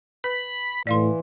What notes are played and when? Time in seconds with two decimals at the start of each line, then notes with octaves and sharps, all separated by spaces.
0.24 B4 B5
0.87 A2 E3 D5 F5 C6